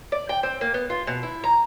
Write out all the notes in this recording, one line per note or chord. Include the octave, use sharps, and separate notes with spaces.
D5
G5
C4
A#3
B3
F4
B2
E4
A#5